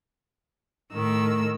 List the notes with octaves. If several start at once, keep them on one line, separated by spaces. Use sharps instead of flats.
A2 D#3 E6